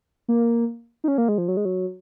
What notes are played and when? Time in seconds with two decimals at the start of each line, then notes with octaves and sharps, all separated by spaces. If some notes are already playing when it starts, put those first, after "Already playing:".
0.28 A#3
1.04 D#4
1.08 C#4
1.18 A#3
1.29 G#3
1.38 F3
1.48 F#3
1.57 G#3
1.65 F#3